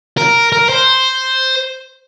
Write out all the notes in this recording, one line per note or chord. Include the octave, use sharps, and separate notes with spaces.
A#4
A#4
C5